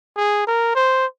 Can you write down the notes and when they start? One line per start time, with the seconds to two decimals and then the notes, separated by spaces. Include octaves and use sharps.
0.17 G#4
0.47 A#4
0.75 C5